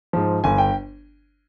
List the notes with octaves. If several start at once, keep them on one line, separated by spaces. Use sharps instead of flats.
G#2 F3
G1 G#5
G5